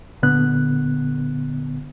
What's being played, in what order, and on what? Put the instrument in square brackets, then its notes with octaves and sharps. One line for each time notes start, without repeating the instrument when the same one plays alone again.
[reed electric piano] A#2 D3 B3 F#6